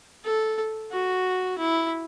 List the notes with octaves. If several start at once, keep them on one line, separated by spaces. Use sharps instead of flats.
A4
F#4
E4